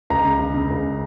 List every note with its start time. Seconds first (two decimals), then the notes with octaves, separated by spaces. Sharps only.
0.10 C#2 A#5
0.24 C#3
0.40 C#3
0.54 C#3
0.70 C#2